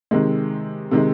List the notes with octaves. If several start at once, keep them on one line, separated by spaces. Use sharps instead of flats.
C3 D#3 G#3
C3 D#3 G#3